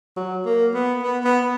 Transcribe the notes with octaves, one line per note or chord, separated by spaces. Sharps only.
F#3
A#3
B3
B3
B3